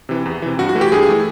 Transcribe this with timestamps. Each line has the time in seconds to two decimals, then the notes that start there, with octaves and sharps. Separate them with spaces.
0.09 C3 E3
0.26 E2
0.42 C3 E3
0.59 G2 F#4
0.69 F#4
0.75 E3 A3
0.81 G4
0.92 G2 G#4
1.08 E3 A3